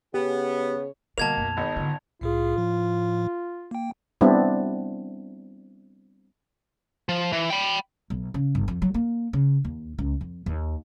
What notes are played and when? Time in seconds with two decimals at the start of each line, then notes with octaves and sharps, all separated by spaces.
0.14 C#3 B3 G4 G#4 C#5
1.18 B2 D3 G3 A#3 A5 G#6 F7
1.37 B1 F#2
1.57 G#1 B3 D#4
1.76 D3 F4
2.21 C2 A2 F4 G#4
2.56 A2 F3
3.71 A#3 G5
4.21 G3 B3 C4 D4 E4
7.09 F3
7.32 E3
7.50 G5 B5
8.10 B1
8.34 C#3
8.55 G1
8.68 F2
8.82 F#3
8.94 A#3
9.33 C#3
9.65 D#2
9.98 C#2
10.21 F2
10.46 D#2